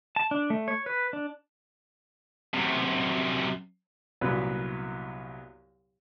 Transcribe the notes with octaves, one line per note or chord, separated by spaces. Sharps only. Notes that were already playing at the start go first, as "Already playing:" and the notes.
A5
D4
A3
C#5
B4
D4
F#2 C3
C2 F#2 A#2 F#3 B3 B4